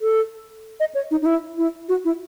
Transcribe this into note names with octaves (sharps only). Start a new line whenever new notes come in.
A4
D#5
C#5
D#4
D#4
E4
E4
F#4
E4